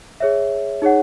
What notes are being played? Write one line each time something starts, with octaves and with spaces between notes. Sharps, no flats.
G#4 C#5 E5
D#4 G#4 C#5 F#5